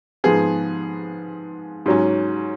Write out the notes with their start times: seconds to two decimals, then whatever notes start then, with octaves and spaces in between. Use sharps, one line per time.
0.24 G#2 F3 B3 G#4
1.86 G#2 F#3 C#4